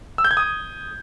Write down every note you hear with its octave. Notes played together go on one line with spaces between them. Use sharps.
E6
G6
G#6
D#6